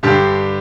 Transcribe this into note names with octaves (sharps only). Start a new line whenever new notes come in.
G2 D3 G4